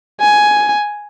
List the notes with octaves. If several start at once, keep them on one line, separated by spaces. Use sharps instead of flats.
G#5